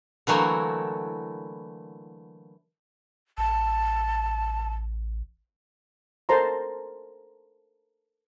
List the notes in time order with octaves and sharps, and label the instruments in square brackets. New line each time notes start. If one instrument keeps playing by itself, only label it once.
[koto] D3 E3 F#3 A3 A#3 E4
[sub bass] A1 [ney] A5
[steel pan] A4 A#4 C5 A5 A#5 C6